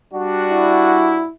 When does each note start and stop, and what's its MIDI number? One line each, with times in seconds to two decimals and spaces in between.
0.14 1.27 55
0.14 1.27 62
0.14 1.27 66
0.52 1.31 64